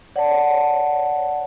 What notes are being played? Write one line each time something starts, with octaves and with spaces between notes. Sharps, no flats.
C#5 D5 F#5 A5